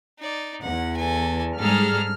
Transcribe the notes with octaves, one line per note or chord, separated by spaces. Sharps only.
D#4 D5
E2 F#5
A4 G#5
G#2 G3 G#4 A4 A#5 F6